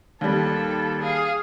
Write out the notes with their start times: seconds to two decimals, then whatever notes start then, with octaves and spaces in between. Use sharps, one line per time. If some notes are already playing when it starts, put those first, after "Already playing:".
0.21 D#2 G3 A4
1.02 G#4 F5